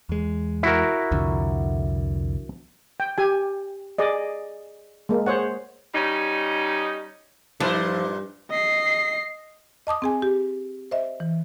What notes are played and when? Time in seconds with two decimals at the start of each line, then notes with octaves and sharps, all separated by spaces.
0.09 E2 G#3
0.63 E4 F#4 A#4
1.11 C2 F2 D3
3.00 G5
3.18 G4 G#5
3.98 G#4 D5 D#5
5.09 G#3 A#3
5.26 G#4 C5 C#5 F#5
5.94 G3 C#4 D#4
7.60 G2 A#2 E3 F3 A3 D4 D#4 C5
8.50 D#5 C7
9.87 D#5 A5 D6 D#6
10.02 C4 G#4 G#5
10.22 G4
10.91 C5 D#5 E5
11.20 E3